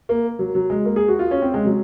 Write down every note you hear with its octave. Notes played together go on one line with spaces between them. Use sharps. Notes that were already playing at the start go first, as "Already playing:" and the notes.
A#3
F#3
F#3
G#3
A#3
G#4
F#4
F4
C#4
C4
G#3
F#3